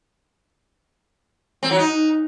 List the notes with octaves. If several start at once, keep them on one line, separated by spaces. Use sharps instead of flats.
C4
F#3
D#4